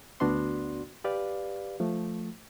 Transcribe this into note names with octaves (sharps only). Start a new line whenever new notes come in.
D2 B3 D4 F#4 D5 C6
G4 B4 D5 F5
F3 A3